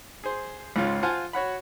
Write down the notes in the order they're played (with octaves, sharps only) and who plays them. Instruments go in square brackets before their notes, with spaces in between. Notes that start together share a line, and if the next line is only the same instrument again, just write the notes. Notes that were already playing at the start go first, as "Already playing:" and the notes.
[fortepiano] G#4 C5
C#2 G#2 C#4 F4 F6
F4 C5 F5 F#5 G#5 A5
F#4 C#5 F#5 B5